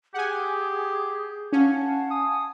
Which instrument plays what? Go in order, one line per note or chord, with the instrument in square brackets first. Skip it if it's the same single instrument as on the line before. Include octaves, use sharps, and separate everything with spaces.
[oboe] G4 [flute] G#4 [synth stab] F#5 G#5
[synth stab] C#4 [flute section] F5 F#5 A5 [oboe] G#5
[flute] G#5 [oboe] D#6